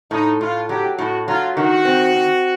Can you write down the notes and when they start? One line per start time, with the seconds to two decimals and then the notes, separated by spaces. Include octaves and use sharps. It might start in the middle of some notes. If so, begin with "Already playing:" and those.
0.11 A2 D#4
0.40 A2 F4
0.69 F#3 G4
0.98 A2 F#4
1.28 F#3 F4
1.56 D#3 F#4
1.85 C4
2.14 C4